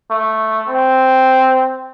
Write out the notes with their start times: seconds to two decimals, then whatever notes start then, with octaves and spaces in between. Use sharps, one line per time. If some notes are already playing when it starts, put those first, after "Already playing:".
0.11 A3
0.69 C4